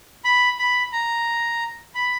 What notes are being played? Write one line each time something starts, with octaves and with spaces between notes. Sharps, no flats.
B5
B5
A#5
B5